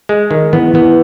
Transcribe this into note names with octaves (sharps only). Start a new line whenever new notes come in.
G#3
D#3
E3 B3
E3 B3